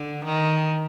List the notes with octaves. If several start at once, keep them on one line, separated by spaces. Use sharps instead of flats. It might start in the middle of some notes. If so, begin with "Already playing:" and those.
Already playing: D3
D#3